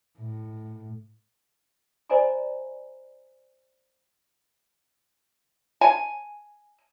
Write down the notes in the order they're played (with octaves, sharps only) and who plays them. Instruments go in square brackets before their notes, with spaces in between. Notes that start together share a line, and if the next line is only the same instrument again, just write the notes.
[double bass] A2
[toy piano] C5 D5 D#5 G#5 A#5 B5
[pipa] G#5